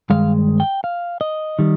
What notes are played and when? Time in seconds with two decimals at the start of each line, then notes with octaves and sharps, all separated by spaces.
0.10 G2 D#3 G#3 F5
0.60 G5
0.84 F5
1.21 D#5
1.59 D#3 G3